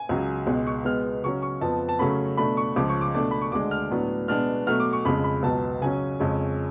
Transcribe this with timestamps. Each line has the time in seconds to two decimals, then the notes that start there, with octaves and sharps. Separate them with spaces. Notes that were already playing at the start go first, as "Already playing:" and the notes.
Already playing: G#5
0.09 C#2 C#3 F#3
0.47 C#2 B2 G#3
0.67 C#6
0.85 B2 G#3 B3 F6
1.23 C#3 F#3 C#4 C#6
1.42 C#6
1.61 F2 F3 B3 A5
1.89 A5
1.99 C#3 F#3 A3 C#4 B5
2.37 B2 A3 D4 B5
2.57 C#6
2.76 C#2 C#3 F3 D6
2.89 C#6
3.01 D6
3.14 B2 A3 D4 D6
3.31 B5
3.42 C#6
3.52 D2 D3 G#3 D4 D6
3.71 F6
3.91 A2 F#3 B3 D4
4.28 B2 G#3 B3 D4 F6
4.66 B2 F#3 A3 F6
4.80 D6
4.93 C#6
5.05 F2 C#3 G#3 B5
5.24 B5
5.43 C#2 B2 F#3 B3 A5
5.81 C#3 F#3 C#4 G#5
6.20 F2 C#3 G#3 C#4